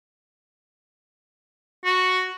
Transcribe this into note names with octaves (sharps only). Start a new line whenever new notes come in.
F#4